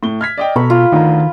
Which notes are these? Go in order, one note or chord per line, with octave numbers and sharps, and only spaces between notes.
A2 G7
F6 G#6 B6
D5 D#5 G5
B2 A4 A#5 B5 C#6
F4
D2 D#3 A#5